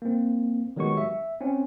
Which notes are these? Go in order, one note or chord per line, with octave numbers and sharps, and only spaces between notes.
A#3 C4
D#3 F#3 G#3 B3 G4 C#6
E5
C4 C#4